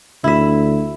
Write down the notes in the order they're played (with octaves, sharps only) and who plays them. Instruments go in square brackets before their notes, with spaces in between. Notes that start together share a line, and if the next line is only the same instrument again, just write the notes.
[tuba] D2 [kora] E4 E5